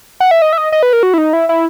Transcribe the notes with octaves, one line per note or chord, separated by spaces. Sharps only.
F#5
E5
D#5
E5
D#5
D#5
B4
A#4
F#4
E4
D#4
E4
E4